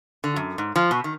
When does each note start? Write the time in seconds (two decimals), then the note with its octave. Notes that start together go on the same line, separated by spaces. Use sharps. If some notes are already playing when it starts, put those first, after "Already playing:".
0.24 D3
0.36 F#2
0.58 G#2
0.76 F3
0.91 B2
1.04 D#3